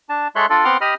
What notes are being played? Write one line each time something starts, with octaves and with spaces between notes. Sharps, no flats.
D4 A5
G#3 A4 C#5 E5 C6 F#6
D4 F4 A4 D5
B3 C4 F#5 C6 D6 F6
G4 D#5 B5 D#6 F6